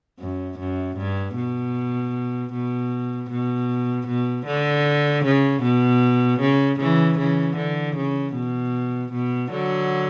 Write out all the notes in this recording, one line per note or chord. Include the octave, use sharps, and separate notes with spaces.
F#2
F#2
G2
B2
B2
B2
B2
D3
C#3
B2
C#3
C#3 E3
C#3 E3
D3
C#3
B2
B2
D3 F#3